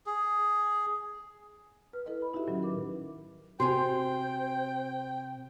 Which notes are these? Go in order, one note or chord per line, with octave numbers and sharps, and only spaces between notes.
G#4
B4 F6
E4 A4 B4 D#5
B5
D#4 E4 F#4 G4 E5
A2 D#3 F#3 C#4
A#4 B4 D6
C3 F#4 A#4 C5 G5 G#5